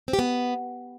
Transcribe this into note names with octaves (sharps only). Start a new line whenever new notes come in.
C4
G4
B3